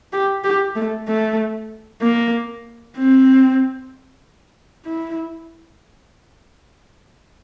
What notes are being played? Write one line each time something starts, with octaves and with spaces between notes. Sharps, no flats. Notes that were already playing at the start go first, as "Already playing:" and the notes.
G4
G4
A3
A3
A#3
C4
E4